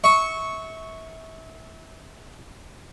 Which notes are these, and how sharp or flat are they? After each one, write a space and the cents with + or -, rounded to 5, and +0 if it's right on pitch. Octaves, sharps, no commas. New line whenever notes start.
E5 -30 C#6 +0